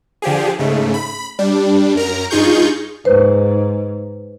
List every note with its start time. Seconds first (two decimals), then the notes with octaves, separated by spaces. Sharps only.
0.22 D3 F3 G4 G#4
0.59 G#2 C#3 A3
0.94 B5
1.39 G3 D4
1.95 F#2 A#4 A#5
2.30 G2 D#4 F4 G#4 C#6 G6
3.05 G#2 B4 C5